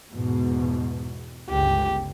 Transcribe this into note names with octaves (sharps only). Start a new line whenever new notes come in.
E2 G#2 B2
G1 C#2 G4